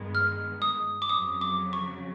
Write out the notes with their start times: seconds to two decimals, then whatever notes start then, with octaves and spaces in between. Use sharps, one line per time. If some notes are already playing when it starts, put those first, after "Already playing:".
Already playing: G2 D#3 G#3 B3
0.15 F6
0.62 D#6
1.02 D6
1.09 F2 C#3 F#3 D#6
1.41 D6
1.73 C#6